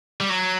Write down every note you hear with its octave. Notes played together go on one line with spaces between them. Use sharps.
G3
F#3